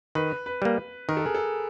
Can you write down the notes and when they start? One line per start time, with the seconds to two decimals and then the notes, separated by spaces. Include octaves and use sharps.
0.15 D#3 B4
0.46 B4
0.62 G3 A#3
1.09 D#3 A#4
1.17 A4
1.25 G#4
1.34 A4